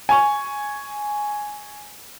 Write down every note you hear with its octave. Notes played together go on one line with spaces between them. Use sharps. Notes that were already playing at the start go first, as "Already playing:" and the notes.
G#5 C#6